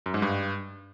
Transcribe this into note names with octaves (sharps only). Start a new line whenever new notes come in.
F#2
G#2
G2